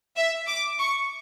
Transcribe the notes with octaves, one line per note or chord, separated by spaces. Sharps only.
E5
D6
C#6